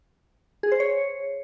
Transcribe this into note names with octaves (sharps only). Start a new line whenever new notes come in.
G#4
C5
C#5